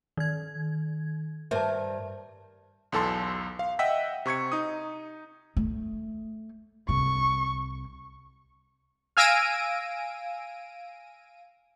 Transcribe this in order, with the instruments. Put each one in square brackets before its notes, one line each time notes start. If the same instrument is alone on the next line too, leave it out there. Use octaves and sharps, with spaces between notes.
[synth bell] D#3 G#6
[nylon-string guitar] G2 A#4 C5 [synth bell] E5 A5
[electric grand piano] B1 E2 A4 A5 C6
F5
D#5 E5 F#5 G5 E6 B6
C3 C#6 G#6 C#7
D#4 D#6
[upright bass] A3
[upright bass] C2 [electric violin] C#6
[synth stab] F5 G#5 E6 A#6 D7 D#7